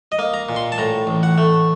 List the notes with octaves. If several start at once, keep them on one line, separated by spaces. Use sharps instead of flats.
D#5
A#3
A#5
A#2
C6
A5
A2 A#5
A1
F#5
A3